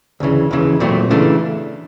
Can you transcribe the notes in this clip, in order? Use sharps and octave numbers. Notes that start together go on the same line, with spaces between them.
D2 C#3 E3
D#2 C#3 E3
A#2 F#3 A3 C4
C#3 E3 A3 D4